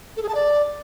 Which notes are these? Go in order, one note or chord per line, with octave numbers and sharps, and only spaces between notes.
A4
G#4
A5
D5